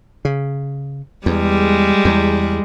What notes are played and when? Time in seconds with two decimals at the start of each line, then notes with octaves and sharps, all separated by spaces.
0.25 C#3
1.26 E2 G3 G#3
2.05 E2